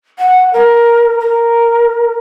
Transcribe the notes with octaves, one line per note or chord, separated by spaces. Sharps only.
F#5
A#4
A#4